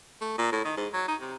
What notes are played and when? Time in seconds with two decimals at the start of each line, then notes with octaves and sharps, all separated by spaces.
0.21 A3
0.38 A#2
0.52 A2
0.65 D#3
0.77 G#2
0.93 F#3
1.08 D#4
1.21 C3